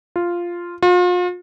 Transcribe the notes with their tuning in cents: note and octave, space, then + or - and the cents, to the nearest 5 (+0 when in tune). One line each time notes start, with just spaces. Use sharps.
F4 -5
F4 +40